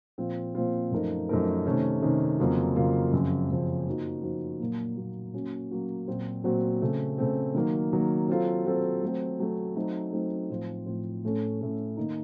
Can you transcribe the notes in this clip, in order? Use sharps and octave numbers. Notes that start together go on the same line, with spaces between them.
A#2 F3 C4 F4
A#2 F3 C4 F4
F#2 F3 A3 D#4 A#4
F#2 F3 A3 D#4 A#4
C3 D#3 A3 C#4
C3 D#3 A3 C#4
F2 C#3 F#3 A#3 F4
F2 C#3 F#3 A#3 F4
F#2 C#3 F3 C4
F#2 C#3 F3 C4
F3 A#3 D#4 F#4
F3 A#3 D#4 F#4
A#2 F#3 A#3
A#2 F#3 A#3
F#3 A#3 C#4 F#4
F#3 A#3 C#4 F#4
A#2 F#3 C4 F#4 C5
A#2 F#3 C4 F#4 C5
C#3 A3 C4
C#3 A3 C4
D#3 F#3 A#3
D#3 F#3 A#3
F#3 C4 F4 A4
F#3 C4 F4 A4
F#3 A3 C4
F#3 A3 C4
F#3 A3 C4 D#4
F#3 A3 C4 D#4
A2 F3 C4 F4 C5
A2 F3 C4 F4 C5
A2 A3 C#4 A4
A2 A3 C#4 A4
D#3 A#3 D#4